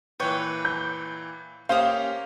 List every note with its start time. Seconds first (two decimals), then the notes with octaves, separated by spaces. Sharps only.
0.20 A#2 E3 B4 C#5 G5
0.65 G6
1.69 A#3 C#4 G4 C5 F5 D#6